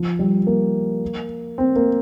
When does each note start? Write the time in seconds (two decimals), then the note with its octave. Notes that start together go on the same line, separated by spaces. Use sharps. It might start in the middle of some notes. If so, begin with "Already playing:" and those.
Already playing: F3
0.19 G3
0.47 A#3
1.58 C4
1.76 A#3